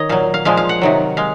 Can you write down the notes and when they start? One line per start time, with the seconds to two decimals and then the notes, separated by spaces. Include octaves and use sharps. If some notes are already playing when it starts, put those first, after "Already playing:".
Already playing: D#3 C#5 D#5
0.09 A#2 F#3 F5
0.34 F5
0.45 A#2 F3 G#3 F5
0.57 F5
0.69 F#5
0.82 C3 D#3 F#3
1.17 G#3 F5